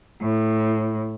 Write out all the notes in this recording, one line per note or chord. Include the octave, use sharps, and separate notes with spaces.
A2